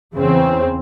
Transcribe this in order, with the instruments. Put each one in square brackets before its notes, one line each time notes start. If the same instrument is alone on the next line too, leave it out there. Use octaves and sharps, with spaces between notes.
[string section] E2 C#3 E3 C4